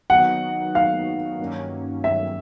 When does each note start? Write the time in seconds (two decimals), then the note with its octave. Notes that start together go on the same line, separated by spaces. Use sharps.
0.10 D#3 F#3 B3 D#4 F#4 F#5
0.75 F5
1.39 G2 D#3 F#3 A#3 C#4
2.04 E5